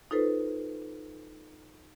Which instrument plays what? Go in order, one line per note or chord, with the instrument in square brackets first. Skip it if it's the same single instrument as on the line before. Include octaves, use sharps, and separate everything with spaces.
[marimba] D#4 F4 A4 B4 C5